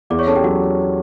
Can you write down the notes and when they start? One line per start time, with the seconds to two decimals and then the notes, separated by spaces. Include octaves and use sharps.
0.10 E2 D5 D6
0.19 C#5 C#6
0.27 C#4 A4 A5
0.36 G4 G5
0.44 F#3 F#4 F#5